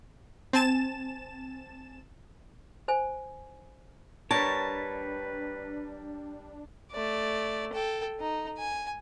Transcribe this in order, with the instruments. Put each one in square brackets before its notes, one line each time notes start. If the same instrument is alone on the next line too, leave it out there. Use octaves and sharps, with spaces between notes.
[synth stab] C4 G#5 A5 A6 E7
[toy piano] C5 G#5
[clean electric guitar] G3 A#4 C#5 [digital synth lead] D4 [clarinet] B4 [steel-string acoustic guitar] A5
[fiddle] A3 D5
A4 G5
D#4
G#5